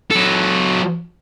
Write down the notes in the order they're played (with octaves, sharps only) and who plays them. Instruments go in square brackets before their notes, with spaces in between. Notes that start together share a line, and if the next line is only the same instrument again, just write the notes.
[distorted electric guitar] F#3 A4